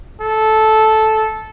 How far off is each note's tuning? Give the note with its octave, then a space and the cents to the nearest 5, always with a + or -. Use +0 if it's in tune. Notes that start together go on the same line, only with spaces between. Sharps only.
A4 -10